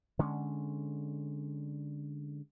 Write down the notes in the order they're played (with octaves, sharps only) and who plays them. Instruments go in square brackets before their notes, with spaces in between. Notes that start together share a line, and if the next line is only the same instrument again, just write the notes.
[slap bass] D3 G#3 C#4